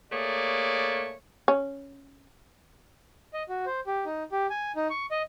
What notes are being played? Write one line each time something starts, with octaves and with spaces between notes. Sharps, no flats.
A3 A#3 G#4 C#5 D5
C#4
D#5
F#4
C5
G4
D#4
G4
G#5
D#4
C#6
D#5